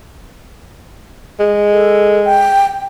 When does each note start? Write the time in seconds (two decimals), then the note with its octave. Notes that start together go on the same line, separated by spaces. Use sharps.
1.40 G#3
1.72 A4
2.25 G5